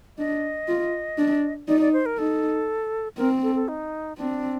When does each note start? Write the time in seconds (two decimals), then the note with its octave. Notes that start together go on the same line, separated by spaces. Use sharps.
0.18 D4 D#5
0.68 F4
1.18 D4
1.68 D#4 D5
1.80 D5
1.93 C5
2.06 A#4
2.18 D#4 A4
3.18 C4 A#4
3.43 A4
3.55 A4
3.68 D#4
4.18 C4 D4